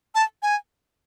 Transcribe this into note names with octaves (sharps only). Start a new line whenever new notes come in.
A5
G#5